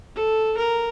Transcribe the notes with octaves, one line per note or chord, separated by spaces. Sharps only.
A4
A#4